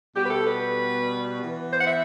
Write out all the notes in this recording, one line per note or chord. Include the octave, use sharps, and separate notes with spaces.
B2 G3 B3 G4
B4
A4
B4
E3 B3
C5
F#5
E5